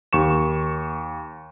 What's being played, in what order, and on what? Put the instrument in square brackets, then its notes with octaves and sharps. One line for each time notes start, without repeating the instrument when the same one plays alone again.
[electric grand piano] D#2 C#6 E7